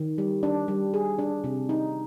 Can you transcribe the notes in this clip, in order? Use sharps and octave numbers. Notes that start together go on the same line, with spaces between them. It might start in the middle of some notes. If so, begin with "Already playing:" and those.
Already playing: D#3
G3
D4
G3
G#4
D4
C3
D#4